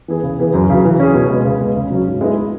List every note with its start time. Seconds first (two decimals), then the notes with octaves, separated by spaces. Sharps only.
0.08 E3 B3 G#4
0.23 C#3
0.39 E3 B3 G#4
0.54 F#2
0.70 C#3 F#3
0.85 E3
1.00 C#4 G#4
1.14 B2
1.30 G#3 B3
1.45 C#3
1.61 G#3 B3
1.76 C#3
1.91 F#3 C#4 F#4
2.07 G#2
2.21 G#3 B3 E4 G#4